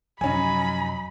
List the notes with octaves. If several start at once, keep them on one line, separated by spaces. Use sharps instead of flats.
F#2 C3 F3 F#3 C#4 D#4 G#5 B5